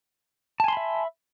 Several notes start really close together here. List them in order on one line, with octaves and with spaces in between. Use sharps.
A5 G#5 C6 B5 E5